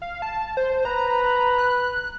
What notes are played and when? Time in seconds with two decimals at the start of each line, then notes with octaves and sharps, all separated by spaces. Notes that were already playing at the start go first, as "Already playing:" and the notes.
0.02 F5
0.22 A5
0.57 C5
0.85 B4 A#5
1.58 F#6